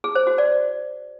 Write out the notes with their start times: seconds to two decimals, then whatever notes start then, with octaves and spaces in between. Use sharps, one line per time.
0.04 G#4
0.15 C5
0.27 F#4
0.38 D5